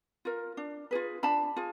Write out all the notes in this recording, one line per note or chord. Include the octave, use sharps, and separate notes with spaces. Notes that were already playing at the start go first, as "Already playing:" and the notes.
F4 A#4
D4
F4 G#4 B4
D4 A5 B5
F4 G#4